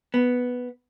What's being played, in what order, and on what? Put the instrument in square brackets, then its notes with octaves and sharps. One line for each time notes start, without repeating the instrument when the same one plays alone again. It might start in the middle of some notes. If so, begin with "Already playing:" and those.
[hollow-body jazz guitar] B3